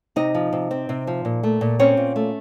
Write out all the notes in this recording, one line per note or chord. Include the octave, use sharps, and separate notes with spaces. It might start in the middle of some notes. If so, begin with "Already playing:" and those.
C3 D#4 D#5
F3
C3
C4
C3
F3
A#2
A3
A#2
C4 C#4 C#5
A#2
A3